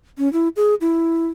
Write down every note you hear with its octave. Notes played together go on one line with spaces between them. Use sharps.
C#4
E4
G#4
E4